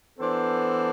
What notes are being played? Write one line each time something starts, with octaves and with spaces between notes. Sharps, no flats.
E3 B3 D4 A4 C5